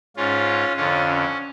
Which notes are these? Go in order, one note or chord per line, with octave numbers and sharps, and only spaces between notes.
G#2 C#4 F4
F2 D3 C#4 F4
C#4